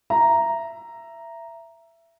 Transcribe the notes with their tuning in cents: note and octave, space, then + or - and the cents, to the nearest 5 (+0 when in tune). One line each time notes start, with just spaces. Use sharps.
E5 +20 A#5 +0